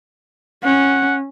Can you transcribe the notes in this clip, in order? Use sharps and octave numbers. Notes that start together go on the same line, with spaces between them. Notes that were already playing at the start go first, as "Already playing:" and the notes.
C#4 F#5